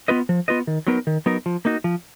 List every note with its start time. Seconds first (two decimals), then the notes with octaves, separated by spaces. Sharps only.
0.08 B3 F4 B4 D#5
0.29 F3
0.48 B3 F4 B4 D#5
0.67 D#3
0.87 F#3 B3 D#4 A#4
1.07 D#3
1.26 F#3 B3 D#4 A#4
1.46 F3
1.65 A#3 D#4 F#4
1.84 F3